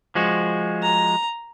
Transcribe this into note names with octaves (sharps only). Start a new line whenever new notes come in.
F3 G#3 F#4
A#5